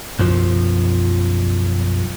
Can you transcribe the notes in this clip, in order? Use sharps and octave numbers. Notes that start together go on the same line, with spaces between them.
B1 F#2 F3